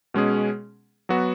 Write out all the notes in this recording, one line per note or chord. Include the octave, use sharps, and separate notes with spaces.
B2 G#3 C#4 G#4
F#3 B3 F#4